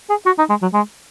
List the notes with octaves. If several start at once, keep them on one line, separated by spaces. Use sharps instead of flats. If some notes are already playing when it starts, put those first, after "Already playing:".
G#4
F#4
D#4
G#3
F#3
G#3